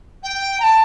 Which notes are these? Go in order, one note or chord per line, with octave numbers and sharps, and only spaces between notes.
G5
A#5
A5